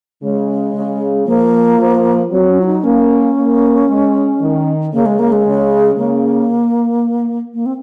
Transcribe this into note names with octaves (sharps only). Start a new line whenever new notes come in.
C#3 G#3
C#3
F3 A#3
F3
F#3 C4
C#4
F4
D#4
A#3 C#4
A#3
G#3
D#3
C#3 A#3
G#3
A#3
G#3
C#3
C#3 A#3
A#3
C4